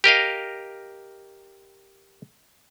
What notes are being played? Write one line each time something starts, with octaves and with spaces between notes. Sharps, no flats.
G4 A#4 D#5 F5